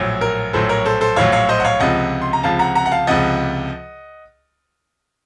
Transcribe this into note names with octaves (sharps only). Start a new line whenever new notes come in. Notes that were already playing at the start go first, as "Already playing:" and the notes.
Already playing: A#1 A2 F#3
A#4
A#1 A2 F#3 A4 C5
A#4 C#5
A4 C5
A4 C5
A#1 A2 F#3 C#5 F5
C#5 F5
C5 D#5
F#5
C#5 F5
C#2 C3 F3 D#5 F#5
C6
A#5
C#2 C3 F3 F5 A5
F#5 A#5
F#5 A#5
F#5
F5 A5
C#2 C3 F3 D#5 F#5